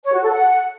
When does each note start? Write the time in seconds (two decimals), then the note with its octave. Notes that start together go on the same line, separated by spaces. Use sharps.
0.04 C#5
0.14 F#4
0.23 A4
0.33 F#5